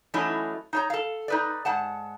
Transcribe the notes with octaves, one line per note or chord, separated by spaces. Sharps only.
E3 F#3 A3 C#4 D#4 E4
D#4 C#5 A#5
A4 F5
D#4 B4 D5
G#2 F#5 A5